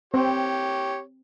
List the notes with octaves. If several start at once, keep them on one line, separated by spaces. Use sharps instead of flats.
C4 G4 C5 C#5